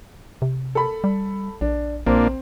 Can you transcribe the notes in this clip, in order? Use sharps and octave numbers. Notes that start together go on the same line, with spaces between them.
C3
A4 B5
G3
A#1 D4
A#1 A#2 A#3 C4 D4